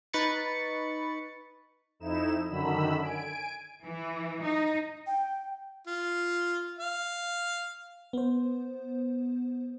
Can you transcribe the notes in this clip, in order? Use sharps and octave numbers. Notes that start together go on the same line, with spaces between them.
D#4 B4 B5 C#6 A6 C#7
F2 D#4 E4 E7
F#2 D3 D#3 B5 E6
G#5 D7
E3
D#4
G5
F4
F5
B3 C5